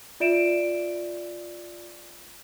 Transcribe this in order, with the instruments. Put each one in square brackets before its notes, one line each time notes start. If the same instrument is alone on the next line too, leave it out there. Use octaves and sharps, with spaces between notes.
[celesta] F4 D5 E5 D7 E7